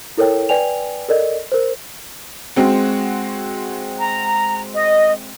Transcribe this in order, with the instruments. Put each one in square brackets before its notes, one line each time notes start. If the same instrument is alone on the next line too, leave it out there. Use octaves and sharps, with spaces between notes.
[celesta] E4 A4 A#4 C#5 G5
B4 D5 G5 G#5 F7
A4 A#4 D5 D#5
A#4 C5
[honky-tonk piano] G#3 C4 F#4
[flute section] A#5
D#5